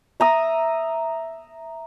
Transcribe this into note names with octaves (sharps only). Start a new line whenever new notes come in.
E5 A#5 D#6